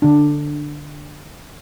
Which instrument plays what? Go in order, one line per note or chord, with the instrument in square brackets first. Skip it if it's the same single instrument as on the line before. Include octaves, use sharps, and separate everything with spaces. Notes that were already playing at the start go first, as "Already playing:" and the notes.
[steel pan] D3 D4